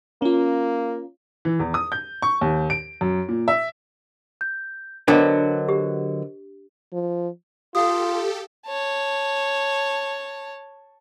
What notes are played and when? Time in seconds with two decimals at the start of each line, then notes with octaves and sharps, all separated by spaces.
0.22 A#3 C#4 F4
1.45 E3
1.59 E2
1.74 D#6
1.92 G6
2.22 C#6
2.41 D#2
2.70 D7
3.01 F#2
3.29 A#2
3.48 E5
4.41 G6
5.08 D3 F#3 B3 D4 A#4 C5 D#5
5.69 G4
6.93 F3
7.75 F4 G4 A4 F5 D#6
8.66 C#5 A5